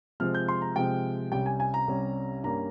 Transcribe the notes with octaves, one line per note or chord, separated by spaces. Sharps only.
C3 F3 G#3 C4 F6
G6
C6
A#5
C3 F3 G#3 C4 G5
C2 C3 G3 C#4 G5
G#5
G#5
A#5
C2 C3 G3 C#4
G2 G3 A#3 C#4 A#5